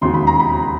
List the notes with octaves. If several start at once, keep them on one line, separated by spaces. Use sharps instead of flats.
E1 D#2 C#3 C6
B5
A#5
B5